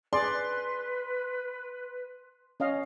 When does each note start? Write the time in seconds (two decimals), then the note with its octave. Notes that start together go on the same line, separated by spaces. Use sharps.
0.13 G#4 B4 D5 C6
2.60 C#4 D#5 F5